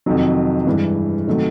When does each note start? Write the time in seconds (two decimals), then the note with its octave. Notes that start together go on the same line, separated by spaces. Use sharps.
0.06 F2 C3 D#3 F#3
0.67 G2 E3 G#3
1.27 C3 D#3 F#3 A3